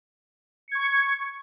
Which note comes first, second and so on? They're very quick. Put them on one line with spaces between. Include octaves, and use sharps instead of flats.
C#7 G#6 C#6